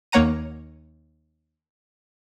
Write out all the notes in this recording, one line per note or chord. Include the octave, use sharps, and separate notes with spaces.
D#2 A#3 C#5 F#5 A#5 D#7